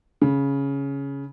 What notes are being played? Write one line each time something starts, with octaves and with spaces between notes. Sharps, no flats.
C#3